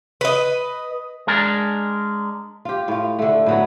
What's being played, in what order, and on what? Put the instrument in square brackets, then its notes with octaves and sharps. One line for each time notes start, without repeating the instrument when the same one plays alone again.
[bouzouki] B4 D#5
[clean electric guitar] G#3 D4 A#4
[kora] F4 G4
A2 F4
D3 A3
A2 F#3 B3